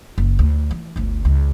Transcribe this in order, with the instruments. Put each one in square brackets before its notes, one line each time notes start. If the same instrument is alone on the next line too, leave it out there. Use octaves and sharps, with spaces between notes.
[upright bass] F#1
D2
E3
G1 D2
C#2